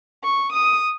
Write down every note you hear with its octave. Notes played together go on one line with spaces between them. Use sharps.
C#6
D#6